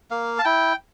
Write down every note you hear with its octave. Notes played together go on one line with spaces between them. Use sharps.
A#3 F5
A5
E4 G5